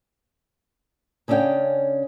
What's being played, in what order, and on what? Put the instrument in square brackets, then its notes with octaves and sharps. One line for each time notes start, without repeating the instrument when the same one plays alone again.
[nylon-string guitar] C#3 C#4 D4 E5 F5 G5